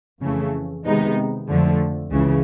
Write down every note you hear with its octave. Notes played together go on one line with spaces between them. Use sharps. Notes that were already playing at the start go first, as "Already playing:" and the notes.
F2 C#3 E3 A3
C3 D#3 G#3 B3 D#4
F2 D3 F3 A3
C#2 C#3 E3